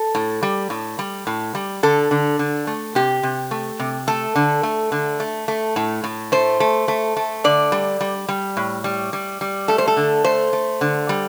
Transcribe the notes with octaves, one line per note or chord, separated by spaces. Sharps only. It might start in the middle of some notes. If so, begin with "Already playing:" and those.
Already playing: A4
A2
G3
A2
G3
A2
G3
D3 A4
D3
D3
A3
C3 G4
C3
A3
C3
A3 A4
D3
A3
D3
A3
A3
A2
A2
A3 C5
A3
A3
A3
D3 D5
G3
G3
G3
A2
G3
G3
G3
A3 A4
C5
A4
D3
A3 C5
A3
D3
G3